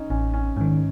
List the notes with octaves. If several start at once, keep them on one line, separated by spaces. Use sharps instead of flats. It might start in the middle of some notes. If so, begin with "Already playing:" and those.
Already playing: C#4 D#4
A1 C#4
C#4
G#2 D#3 C#4